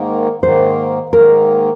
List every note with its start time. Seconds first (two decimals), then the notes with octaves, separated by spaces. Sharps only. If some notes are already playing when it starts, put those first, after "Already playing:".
Already playing: G#2 D#3 A#3
0.43 G#2 D#3 A#3 C5
1.13 G#2 D#3 A#3 A#4